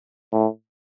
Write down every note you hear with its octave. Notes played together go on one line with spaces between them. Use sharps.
A2